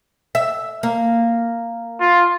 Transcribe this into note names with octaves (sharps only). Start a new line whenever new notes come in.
E5
A#3
F4